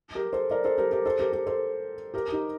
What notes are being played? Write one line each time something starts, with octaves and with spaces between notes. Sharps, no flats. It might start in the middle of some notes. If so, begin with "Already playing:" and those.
G4 A#4
A4 C5
A#4 D5
A4 C5
G4 A#4
G4 A#4
A4 C5
G4 A#4
G4 A#4
A4 C5
G4 A#4
D#4 G4